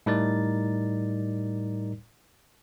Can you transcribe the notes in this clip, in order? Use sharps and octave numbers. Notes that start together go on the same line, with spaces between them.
A2 G3 D#4 A#4 D5 A6